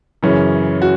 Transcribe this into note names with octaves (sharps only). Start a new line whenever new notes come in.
F#2 C#3 E3 C#4
F#4